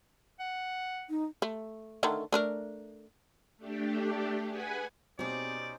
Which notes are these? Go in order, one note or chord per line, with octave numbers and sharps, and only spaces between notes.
F#5
D#4
A3
D3 D#3 A3
A3 D4 A#4
A3 D4 G4
G#4 B4 F#5 G#5 B5
B2 C4 C#4 D#4 G4 G#4 C5 D5